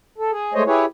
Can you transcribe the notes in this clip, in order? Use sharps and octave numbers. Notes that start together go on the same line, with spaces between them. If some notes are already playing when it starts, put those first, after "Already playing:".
A4
G#4
G#3 A3 C5 C#5 D#5
E4 G4 G#4 B4 C#5